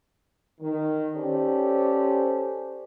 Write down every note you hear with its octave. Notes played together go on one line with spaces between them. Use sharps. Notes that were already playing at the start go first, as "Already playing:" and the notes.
D#3
C#4 G4 A4 C5 D5